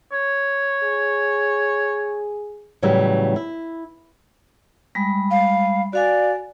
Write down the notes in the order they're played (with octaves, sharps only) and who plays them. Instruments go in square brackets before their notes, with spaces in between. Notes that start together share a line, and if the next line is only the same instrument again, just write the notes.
[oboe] C#5
[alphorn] G#4
[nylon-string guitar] A2 C#3 E3 F#3 G3
E4
[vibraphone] G3 G#3 B5
[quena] F5
[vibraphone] F#4 F5 G#5 [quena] D5